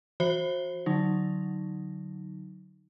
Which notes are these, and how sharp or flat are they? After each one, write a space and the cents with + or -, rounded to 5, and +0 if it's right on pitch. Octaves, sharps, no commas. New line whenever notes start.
E3 +20 F#4 -25 C5 +25
D3 +0 F#3 +0 D#4 +0